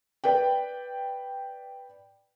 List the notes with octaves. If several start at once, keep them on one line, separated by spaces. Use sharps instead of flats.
B4 D5 G5